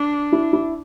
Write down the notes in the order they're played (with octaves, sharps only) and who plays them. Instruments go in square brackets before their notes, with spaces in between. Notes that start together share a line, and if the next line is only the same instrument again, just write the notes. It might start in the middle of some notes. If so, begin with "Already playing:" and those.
Already playing: [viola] D4
[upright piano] E4
E4